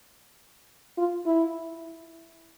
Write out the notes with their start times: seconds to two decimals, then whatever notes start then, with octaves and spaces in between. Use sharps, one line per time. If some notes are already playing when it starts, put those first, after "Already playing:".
0.98 F4
1.26 E4